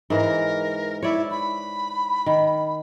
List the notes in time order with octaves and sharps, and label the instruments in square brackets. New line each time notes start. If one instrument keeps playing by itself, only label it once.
[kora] G#2 E3 [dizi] A#4
[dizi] E4 [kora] C#5 D5
[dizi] B5
[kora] D#3